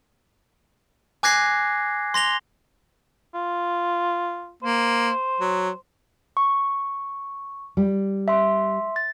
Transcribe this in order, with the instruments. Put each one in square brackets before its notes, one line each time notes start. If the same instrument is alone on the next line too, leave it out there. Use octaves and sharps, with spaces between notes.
[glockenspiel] G#5 D6 F#6 G#6 A#6 C7
C6 A#6 F7 G7
[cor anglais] F4
[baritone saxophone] A#3 [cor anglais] C5
[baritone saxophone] F#3
[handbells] C#6
[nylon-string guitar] G3
[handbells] E5 C6
A6